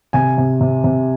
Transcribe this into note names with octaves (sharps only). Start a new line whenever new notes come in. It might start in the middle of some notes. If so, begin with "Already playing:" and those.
C3 G#5
C3
C3
C3